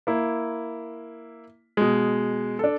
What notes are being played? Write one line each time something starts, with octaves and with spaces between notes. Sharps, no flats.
A#3 E4
B2 G#3
D4 A4